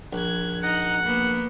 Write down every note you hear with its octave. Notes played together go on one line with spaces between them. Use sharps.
A#1 F#6 G#6
D#4 F#5 A#5 F#6
A#3 B3